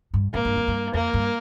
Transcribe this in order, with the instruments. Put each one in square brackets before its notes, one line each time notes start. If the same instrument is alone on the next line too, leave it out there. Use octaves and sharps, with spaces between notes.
[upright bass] G2
[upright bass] G#2 [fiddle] A#3
[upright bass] G2
F2
G2
[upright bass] F2 [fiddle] A#3
[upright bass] G2